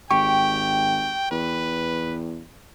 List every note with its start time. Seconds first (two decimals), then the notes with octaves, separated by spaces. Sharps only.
0.11 G#1 G4 G5 C#6
1.31 E2 B4